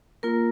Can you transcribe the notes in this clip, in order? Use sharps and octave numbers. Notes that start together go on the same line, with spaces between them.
A#3 F4 A#4